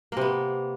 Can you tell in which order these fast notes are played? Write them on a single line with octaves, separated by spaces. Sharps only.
A#3 C3 B3